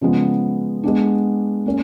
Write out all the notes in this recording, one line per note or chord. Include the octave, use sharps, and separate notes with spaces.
C#3 F3 G#3 B3
G#3 B3 D4
A#3 C#4